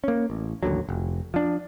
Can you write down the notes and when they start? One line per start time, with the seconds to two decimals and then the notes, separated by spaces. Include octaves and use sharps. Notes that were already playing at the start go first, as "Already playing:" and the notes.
0.04 A#3 C#4
0.30 A1
0.63 A1 D#2 D3 F#3
0.89 F1
1.34 F3 D4